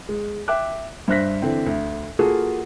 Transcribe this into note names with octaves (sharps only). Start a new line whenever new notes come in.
G#3
E5 G5 D6 F#6
G2 C5 E5 F#6 A#6 B6
D3 E3 C4
D2
A#3 F4 F#4 G#4 A4